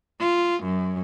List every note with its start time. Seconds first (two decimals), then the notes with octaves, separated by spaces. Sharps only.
0.20 F4
0.64 F#2